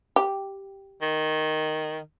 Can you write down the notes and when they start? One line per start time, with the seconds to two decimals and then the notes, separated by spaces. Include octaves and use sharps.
0.16 G4
1.02 D#3